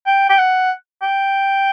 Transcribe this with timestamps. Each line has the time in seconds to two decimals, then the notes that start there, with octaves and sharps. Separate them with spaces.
0.06 G5
0.30 G5
0.38 F#5
1.02 G5